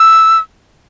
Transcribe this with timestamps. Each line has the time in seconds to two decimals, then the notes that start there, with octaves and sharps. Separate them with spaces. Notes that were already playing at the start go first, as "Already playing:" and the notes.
Already playing: E6